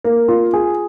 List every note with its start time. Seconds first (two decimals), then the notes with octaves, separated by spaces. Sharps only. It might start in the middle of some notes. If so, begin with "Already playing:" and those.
0.04 A#3
0.28 F4
0.53 G#4